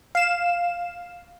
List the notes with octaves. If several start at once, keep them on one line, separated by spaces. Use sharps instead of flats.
F5 E7